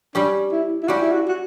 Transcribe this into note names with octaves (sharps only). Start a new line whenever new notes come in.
G3 C#4 D4 G4
E4
E4
G3 C#4 F#4 G4
E4
F#4
F#4